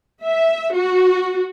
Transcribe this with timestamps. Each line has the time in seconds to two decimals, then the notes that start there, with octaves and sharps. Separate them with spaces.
0.23 E5
0.74 F#4